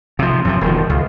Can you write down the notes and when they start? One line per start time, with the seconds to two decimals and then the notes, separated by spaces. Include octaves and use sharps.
0.19 C3 F3
0.45 F#2 C3 F3
0.61 E1 D#3 F3
0.90 C#2